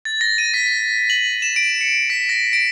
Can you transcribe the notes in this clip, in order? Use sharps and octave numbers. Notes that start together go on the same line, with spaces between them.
A6
A#6
D#7
B6
F#7
E7
D7
C#7
B6
A#6
D7